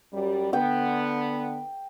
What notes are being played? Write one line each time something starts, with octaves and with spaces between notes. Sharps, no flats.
F#2 G3
D3 B3 G5